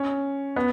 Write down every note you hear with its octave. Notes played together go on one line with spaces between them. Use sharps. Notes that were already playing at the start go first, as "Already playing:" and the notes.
Already playing: C#4
B3